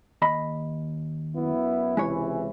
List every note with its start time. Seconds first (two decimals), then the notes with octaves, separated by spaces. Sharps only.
0.22 D#2 D#5 B5
1.34 F#2 B3 E4
1.97 C#2 C3 E3 G#3 E4 C#5